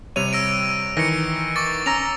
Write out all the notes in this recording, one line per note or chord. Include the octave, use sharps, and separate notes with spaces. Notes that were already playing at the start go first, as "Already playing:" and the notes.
C3 G3 C#5 D#7 F7
E6 A#6 D7
D#3 E3 A#6 C#7
C#6 D6 A6
C#4 A#5 E6 A#6 F7